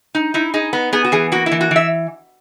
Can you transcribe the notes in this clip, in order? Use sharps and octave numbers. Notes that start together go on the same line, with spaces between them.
D#4
D#4 E4
D#4 G#4
B3
B3 G#4
F#4
E3 G#4
A#3 F#4
E4
E3
F#4
E3 E5